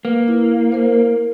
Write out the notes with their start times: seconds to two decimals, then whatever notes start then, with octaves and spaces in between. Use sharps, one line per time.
0.05 A#3 B4
0.28 E4
0.72 A#4 C5